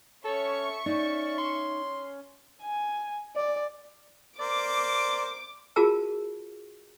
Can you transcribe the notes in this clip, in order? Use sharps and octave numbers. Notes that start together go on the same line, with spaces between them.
C#4 A4 C#5 E5 C#6
C#4 D#4 D5
C6
G#5
D5
A#4 C5 D5 D6
F4 F#4 G#4 A#4 A5 E6